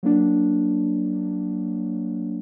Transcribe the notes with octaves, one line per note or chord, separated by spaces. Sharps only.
F#3 A#3 D4